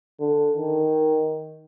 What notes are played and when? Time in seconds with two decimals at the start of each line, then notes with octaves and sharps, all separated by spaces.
0.20 D3
0.57 D#3